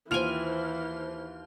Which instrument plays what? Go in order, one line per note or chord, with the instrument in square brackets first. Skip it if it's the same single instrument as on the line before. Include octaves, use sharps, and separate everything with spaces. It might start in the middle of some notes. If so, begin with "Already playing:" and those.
[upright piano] D#2 F7 [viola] E3 [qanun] F4 G5 G#5 [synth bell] C5 F6